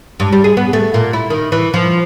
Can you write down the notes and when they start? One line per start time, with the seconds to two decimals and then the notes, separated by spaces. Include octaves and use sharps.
0.20 G2
0.32 G3
0.44 G#4
0.57 B3
0.73 A3
0.94 A#2
1.13 E4
1.30 D#3
1.52 E3
1.74 F3